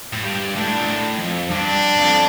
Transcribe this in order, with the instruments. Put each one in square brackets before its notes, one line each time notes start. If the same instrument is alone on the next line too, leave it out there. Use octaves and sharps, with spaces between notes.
[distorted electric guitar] A2
[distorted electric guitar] G2 [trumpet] G4
[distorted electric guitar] A2 [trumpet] D4
[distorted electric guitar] A#2
A2
F2
[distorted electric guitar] G2 [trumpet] D4
[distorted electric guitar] F2